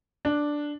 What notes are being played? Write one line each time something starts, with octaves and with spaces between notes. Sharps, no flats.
D4